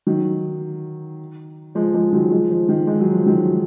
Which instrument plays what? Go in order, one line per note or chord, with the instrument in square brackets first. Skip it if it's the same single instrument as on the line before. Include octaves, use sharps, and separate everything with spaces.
[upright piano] D#3 F#3
F3 G#3
F3 G#3
D#3 F#3
F3 G#3
F3
D#3
G#3
F#3
F3
D#3 F#3